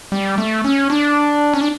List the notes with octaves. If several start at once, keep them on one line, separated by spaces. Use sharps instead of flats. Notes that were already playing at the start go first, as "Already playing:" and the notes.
G3
A3
C#4
D4
C#4
D4